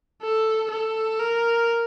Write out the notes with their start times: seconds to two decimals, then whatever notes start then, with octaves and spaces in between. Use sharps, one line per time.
0.22 A4
0.71 A4
1.20 A#4